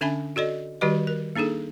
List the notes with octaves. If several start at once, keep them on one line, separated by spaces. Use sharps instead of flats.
D3 C#4 D4 E5 G#5 B5
F#4 A4 D5 D#5
D#3 G3 F#4 G4 B4 D#5
A#4
A#3 D4 D#4 G#4 A4